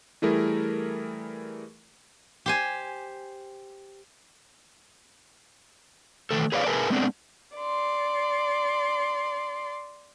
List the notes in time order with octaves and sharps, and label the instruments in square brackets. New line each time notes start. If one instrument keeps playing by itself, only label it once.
[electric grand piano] E3 G3 A3 E4 G#4 A#4
[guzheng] G4 C5 G#5
[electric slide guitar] D#3 E3 A3 A4
G#4 B4 C#5 D5 F5
G#4 A#4 B4 E5 G#5 A5
G#3 A3 B3 C4 D4
[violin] D5 C6